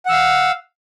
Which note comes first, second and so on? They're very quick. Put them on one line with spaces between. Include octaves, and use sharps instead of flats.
F#5 E6 F5